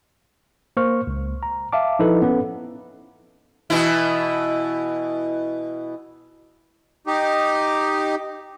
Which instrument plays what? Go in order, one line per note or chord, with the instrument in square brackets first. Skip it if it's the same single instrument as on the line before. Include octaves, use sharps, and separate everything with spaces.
[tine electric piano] A#3 C5 C#6 F6
C#2
A#5
E5 F5 A5 D6
F3 D#4 E4 A4 B4
B3 C#4 B4
[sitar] B2 E3 E4
[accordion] D#4 G4